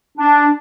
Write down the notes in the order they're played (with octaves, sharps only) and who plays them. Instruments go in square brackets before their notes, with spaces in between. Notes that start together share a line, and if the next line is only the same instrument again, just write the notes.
[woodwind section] D4